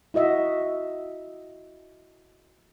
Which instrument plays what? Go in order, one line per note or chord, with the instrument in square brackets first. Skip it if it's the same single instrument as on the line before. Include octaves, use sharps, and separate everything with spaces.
[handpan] E4 F#4 D#5 E5